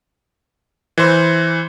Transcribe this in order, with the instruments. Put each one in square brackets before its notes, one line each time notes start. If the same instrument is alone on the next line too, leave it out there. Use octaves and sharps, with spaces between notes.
[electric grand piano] E3 C5